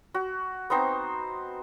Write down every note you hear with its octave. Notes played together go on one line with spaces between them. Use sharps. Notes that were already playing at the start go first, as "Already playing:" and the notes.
F#4
B3 C4 D#4 C5